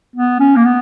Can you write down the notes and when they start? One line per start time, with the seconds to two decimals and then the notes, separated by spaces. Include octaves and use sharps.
0.16 B3
0.40 C#4
0.56 A#3
0.65 B3